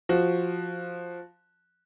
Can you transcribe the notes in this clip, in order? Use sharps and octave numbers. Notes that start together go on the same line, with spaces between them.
F3 F#4